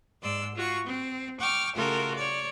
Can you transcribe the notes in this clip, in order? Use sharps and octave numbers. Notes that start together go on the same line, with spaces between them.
G#2 D5 C6 E6
F4 F#4 C#6
C4
G5 C#6 D6 F6
C#3 A3 F4 F#4 A4 A#4
C#5 D5